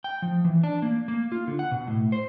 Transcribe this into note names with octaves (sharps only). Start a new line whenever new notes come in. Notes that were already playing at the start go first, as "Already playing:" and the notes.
G5
F3
E3
D4
A#3
A#3
F4
D3
F#5
B2
A2
C5